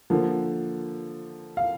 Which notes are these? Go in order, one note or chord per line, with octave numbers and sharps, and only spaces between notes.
D3 F3 A#3
F5